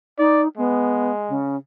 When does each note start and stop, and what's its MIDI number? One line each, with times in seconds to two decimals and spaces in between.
0.18 0.48 63
0.18 0.42 74
0.57 1.37 56
0.57 1.11 59
1.28 1.56 49